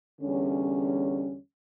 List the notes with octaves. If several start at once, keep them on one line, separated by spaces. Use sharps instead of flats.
E2 D3 G3 C#4